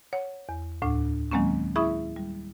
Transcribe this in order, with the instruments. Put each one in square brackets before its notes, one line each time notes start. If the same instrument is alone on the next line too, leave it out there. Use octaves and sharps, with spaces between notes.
[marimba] C#5 F#5
E2
D2 A2 D4
D#3 F#3 G#3 A#3 C4 C#4
E4 G#4 E5 B5 C#6 D#6
G3